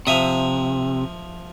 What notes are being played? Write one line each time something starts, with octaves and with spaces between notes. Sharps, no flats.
C3 F3 E5 D#6